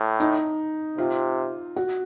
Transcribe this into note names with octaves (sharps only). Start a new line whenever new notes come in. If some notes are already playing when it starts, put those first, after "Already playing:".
Already playing: A2
D#4
C3 F4
F#4